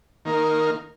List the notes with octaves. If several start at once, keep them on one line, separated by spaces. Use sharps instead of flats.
D#3 A#3 D#4 A#4